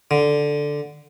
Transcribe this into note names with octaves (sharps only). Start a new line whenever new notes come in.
D3